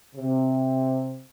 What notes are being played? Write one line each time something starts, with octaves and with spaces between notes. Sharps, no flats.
C3